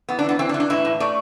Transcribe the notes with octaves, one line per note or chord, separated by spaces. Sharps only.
E3 B3
D4
E3 B3
E3 C4
D4
E3
D4
A2 E4
A2
A3 D5